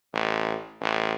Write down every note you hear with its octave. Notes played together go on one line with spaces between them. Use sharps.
A1
A1